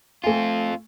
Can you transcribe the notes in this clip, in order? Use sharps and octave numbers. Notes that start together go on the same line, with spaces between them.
A3 C4 F4 G#5